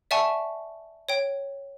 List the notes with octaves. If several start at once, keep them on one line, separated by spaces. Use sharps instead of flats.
D5 E5 F#5 G#5 A5 C#6
C#5 G5